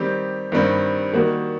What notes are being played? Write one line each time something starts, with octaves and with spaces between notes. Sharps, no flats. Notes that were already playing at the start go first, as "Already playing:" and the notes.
Already playing: D#3 G3 C4 G4
G2 D#3 G3 C4
D#3 G3 A#3 F#4